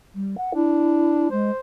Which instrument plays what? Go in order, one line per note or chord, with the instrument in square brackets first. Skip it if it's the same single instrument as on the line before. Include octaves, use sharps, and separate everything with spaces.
[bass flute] G3
F#5
[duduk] D4 [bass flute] E4
[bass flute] G#3 [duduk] C5